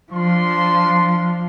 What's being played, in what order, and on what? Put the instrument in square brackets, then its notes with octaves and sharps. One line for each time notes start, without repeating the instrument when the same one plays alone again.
[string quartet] F3 [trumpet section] D4 F4 C6